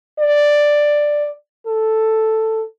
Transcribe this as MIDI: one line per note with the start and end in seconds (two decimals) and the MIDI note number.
0.19 1.30 74
1.67 2.63 69